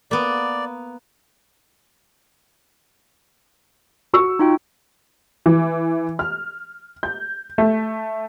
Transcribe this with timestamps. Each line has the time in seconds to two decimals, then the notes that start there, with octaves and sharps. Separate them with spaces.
0.11 A#3 B3 D5
4.13 F#4 C#6 E6
4.39 D#4 F4 G5
5.46 E3
6.19 F6
7.03 G6
7.58 A3